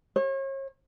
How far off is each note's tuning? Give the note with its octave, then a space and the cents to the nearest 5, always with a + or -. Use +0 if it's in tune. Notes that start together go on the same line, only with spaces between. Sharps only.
C#5 -40